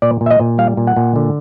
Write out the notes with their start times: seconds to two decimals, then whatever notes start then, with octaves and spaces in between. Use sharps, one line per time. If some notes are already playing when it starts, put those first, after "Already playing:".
0.02 A#2 D5
0.21 A#2
0.26 E5
0.31 D#5
0.40 A#2
0.58 G3 F5
0.77 A#2
0.87 F#5
0.96 A#2
1.16 D3